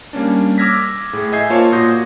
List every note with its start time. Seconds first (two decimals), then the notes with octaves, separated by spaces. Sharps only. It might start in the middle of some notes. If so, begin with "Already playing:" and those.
0.13 G3 A#3 C#4 D4
0.58 D6 E6 F6 G#6 A#6 B6
1.13 A2 G#4
1.32 D#5 E5 G#5 G6 G#6 C7
1.50 A#3 F4 C5 C#5 A5 C#6
1.72 A#2 F#4 C6 D#6 G6 A#6